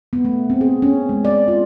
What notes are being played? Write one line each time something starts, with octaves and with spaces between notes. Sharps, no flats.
B3
A3
C4
G#4
C#4
G#3
D5
F4